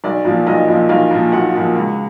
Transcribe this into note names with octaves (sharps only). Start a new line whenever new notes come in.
B1 D5
A#2 F3
B1 D#5
A#2 F3
B1 F5
A#2 F3
B1 F#5
A#2 F3
C#2